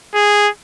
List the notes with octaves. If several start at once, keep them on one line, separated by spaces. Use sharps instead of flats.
G#4